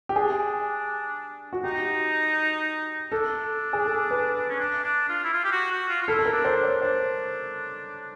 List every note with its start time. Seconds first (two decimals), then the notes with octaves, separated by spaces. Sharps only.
0.09 G4
0.15 D4 G#4
1.53 F#4
1.64 D#4 G4
3.11 D4 A4
3.73 G#4
3.86 A4
4.11 B4
4.49 C#4
4.60 D4
4.84 D4
5.09 F4
5.24 E4
5.33 F4
5.44 G4
5.52 F#4
5.71 F#4
5.89 F4
6.02 F4
6.08 E4 A4
6.19 A4
6.26 A#4
6.32 D4
6.45 C5
6.56 D4
6.63 C#5
6.81 D4 C5